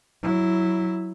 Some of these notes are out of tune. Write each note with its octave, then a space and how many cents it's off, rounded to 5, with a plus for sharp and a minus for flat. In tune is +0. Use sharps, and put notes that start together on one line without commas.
F#3 +0 E4 +0